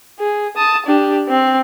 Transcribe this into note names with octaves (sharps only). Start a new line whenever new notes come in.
G#4
A5 D#6
D4 G4
C4